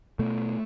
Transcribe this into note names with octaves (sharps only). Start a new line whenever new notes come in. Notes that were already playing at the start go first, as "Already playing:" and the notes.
B2 A3